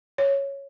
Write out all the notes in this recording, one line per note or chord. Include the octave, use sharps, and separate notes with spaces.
C#5